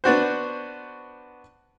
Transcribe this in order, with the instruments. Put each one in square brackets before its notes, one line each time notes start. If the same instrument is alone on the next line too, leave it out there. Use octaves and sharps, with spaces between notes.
[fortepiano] B3 D4 F#4 C5